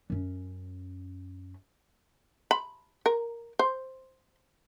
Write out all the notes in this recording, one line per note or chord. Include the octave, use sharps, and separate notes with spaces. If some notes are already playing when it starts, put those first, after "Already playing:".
F#2 C#4
B5
A#4
C5